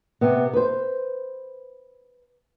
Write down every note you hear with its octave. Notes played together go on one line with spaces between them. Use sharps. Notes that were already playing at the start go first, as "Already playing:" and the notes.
C3 B3
B4 C5